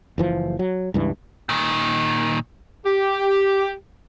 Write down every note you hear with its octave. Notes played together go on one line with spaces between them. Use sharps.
F#1 E3 F3
F#3
C#2 G2 E3
A#2 D#3
G4